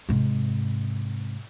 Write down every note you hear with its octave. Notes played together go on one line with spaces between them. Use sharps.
G#2 C3